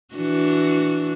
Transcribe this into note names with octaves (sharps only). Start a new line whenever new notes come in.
E3 D4 F#4